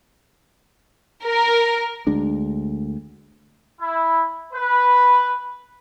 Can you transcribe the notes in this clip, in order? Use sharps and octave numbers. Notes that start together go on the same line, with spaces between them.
A#4
D2 G#3 D4
E4
B4